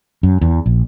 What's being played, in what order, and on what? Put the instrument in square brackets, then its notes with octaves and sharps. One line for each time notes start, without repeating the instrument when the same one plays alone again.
[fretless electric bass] F#2
E2
A#1